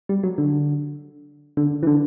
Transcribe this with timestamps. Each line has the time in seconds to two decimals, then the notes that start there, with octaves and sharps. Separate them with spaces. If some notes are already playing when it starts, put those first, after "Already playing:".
0.09 G3
0.23 F#3
0.38 D3
1.57 D3
1.83 E3
1.87 D3